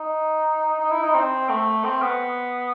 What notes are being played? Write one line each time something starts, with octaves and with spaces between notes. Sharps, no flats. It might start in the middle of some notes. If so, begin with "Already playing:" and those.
Already playing: D#4
D#4
E4
D#4
C4
A3
C4
B3